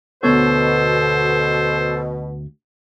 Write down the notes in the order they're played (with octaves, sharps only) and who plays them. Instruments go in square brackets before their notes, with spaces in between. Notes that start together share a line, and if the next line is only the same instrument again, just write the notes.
[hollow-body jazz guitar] D2 B3 C#5 [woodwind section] B2 [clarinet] A4 [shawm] C5